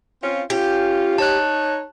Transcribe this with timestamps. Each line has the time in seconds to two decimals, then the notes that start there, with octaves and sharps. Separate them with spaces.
0.22 C4 C#4 F4
0.50 C#4 F4 G4
1.18 D#4 C#5 A5 F#6